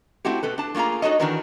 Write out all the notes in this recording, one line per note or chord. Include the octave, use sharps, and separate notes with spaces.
A3 C4 E4 F#4 G4
B2 A4 B4
D4 A5
A3 A#3 F4 G#4 A#5
D#4 F#4 A4 C#5 D#5
D#3 E3 D4 F#4 A#4 B4